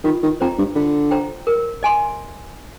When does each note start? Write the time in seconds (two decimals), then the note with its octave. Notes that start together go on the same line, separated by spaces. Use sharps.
0.04 D#3 F4
0.23 D#3
0.41 F2 C5 G5 A#5
0.58 G2
0.75 D3 F4
1.11 C5 G5 A#5
1.47 A#4
1.83 D#5 G#5 C6